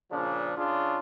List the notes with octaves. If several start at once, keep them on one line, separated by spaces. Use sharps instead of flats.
A#2 C#3 F3 D4
C#3 D4 F4 G#4